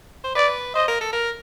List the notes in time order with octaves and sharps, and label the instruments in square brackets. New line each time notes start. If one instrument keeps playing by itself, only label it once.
[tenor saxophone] C5
[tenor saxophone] B4 [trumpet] D5
[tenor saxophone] C5 [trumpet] D#5
[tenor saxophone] A#4
A4
A#4